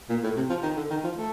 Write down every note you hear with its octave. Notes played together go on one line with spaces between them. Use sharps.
A#2
A2
C3
F3
D#3
D3
D#3
F3
A3